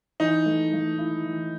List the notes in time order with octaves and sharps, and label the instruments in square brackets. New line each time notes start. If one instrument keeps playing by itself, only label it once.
[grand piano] E3 [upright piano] D#4
[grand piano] A3
A3
E4
E3